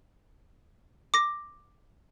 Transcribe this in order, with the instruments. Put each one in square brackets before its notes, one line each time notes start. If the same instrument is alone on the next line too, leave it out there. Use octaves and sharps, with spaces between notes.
[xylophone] D6 A#6